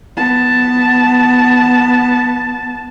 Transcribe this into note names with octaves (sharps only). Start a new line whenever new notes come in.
B3 A5